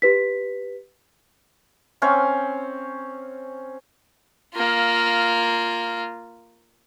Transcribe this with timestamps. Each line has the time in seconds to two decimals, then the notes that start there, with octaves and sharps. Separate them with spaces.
0.02 G4 B4 B6
2.02 C4 C#4 C#5 F5
4.55 A#3 F4